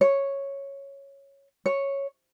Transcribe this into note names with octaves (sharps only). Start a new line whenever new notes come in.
C#5
C#5